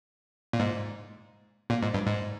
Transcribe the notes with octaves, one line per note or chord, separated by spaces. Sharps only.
A#2
G#2
A#2
G#2
G2
G#2